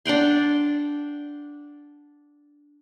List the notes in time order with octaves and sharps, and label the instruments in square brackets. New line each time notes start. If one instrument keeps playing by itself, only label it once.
[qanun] D4 F#5 G5 C6